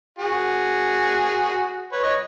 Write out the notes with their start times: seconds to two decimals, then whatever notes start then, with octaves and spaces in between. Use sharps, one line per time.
0.19 F#4 G#4
1.92 B4 C#5
2.03 C#5 D#5